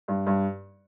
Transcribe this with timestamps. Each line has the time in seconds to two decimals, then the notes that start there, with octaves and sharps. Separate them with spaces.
0.08 G2
0.26 G2